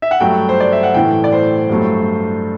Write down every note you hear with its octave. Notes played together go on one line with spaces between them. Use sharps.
E5
F#5
G2 F#3 A3 G5
C5
D5
E5
F#5
A2 E3 A3 G5
D5
C5
G2 F#3 A3